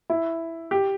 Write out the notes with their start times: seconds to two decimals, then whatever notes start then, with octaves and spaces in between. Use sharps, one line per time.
0.10 E4
0.71 G4